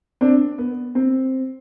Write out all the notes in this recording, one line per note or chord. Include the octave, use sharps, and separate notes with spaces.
C4 D4
B3
C4